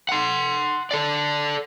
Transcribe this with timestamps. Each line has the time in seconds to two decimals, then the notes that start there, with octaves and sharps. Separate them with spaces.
0.09 F#5 C6
0.91 A4 D5